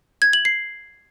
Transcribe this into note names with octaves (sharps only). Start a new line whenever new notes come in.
G#6
F#7
C7